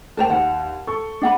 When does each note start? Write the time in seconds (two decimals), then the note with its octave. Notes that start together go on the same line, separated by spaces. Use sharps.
0.17 A#4 C5 G5 A5 E7 F7
0.30 D#2 F#5
0.87 A4 C#6
1.22 D4 F#5 B5